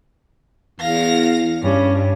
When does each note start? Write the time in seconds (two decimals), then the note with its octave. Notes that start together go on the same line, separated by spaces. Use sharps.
0.80 E2 F5 A#6
1.62 G2 C#4